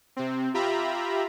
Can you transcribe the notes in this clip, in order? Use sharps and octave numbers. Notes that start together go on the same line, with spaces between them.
C3 C4
F4 G4 E5 A#5 B5